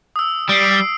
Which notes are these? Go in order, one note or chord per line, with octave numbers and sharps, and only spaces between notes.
D#6 E6
G3 C7 D7